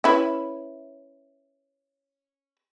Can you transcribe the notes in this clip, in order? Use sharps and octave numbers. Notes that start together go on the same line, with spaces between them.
C#4 E4 B4